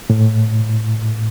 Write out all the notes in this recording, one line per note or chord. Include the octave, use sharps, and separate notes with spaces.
A2